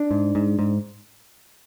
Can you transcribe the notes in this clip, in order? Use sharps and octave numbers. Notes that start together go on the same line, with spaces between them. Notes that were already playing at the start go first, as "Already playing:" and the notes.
Already playing: D4
G#2
G#2
G#2